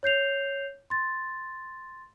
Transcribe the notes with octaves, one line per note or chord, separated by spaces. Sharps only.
C#5 G6 C7 F7
C6 A6